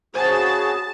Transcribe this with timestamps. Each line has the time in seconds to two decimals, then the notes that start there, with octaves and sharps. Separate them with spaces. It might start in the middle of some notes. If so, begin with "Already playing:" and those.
0.15 C#3 F#4 G#4 C5 A5